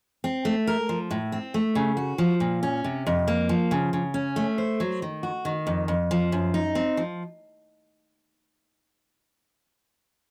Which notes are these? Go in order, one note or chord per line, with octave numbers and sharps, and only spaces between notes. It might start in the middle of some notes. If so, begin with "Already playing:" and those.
C4
A3
A#4
F3
A2
C4
A3
C#3
F#4
F3
A#2
C#4
C3
F2
A#3
F3
C#3
C#3
C#4
A3
C5
F#3
D#3
F#4
D#3
F2
F2
F3
F#2
D#4
C4
F3